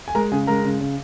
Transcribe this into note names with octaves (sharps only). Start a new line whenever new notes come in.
G#5
G#3 A#4 A#5
C#3 G#4 G#5
G#3 A#4 A#5
C#3
C#3